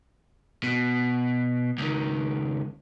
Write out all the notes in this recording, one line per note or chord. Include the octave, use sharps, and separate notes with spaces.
B2
C#2 D#3